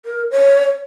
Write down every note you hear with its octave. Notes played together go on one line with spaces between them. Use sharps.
A#4
C#5